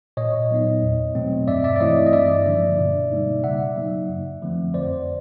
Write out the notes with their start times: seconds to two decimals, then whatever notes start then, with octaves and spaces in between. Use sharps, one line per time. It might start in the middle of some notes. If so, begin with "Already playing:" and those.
0.17 A#2 C#5 D#5
0.50 F#3 B3 D#4
0.82 E2
1.15 B2 F#3 A3 C4
1.48 G2 D5 E5
1.64 D5 E5
1.76 D5
1.80 E3 A3 C4 E4 C#5 D#5
2.06 D#5
2.13 G2 D5 E5
2.46 D3 F3 A#3 D4
2.79 B2
3.11 G3 A#3 D#4
3.44 C#3 E5 F#5
3.76 F#3 A#3 D#4
4.09 F#2
4.42 D3 F3 A3 C4
4.74 F2 C5 D5